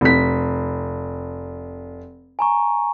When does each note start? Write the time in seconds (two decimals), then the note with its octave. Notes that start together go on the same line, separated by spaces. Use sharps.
0.01 F1 B6
2.39 G#5 A#5 C#6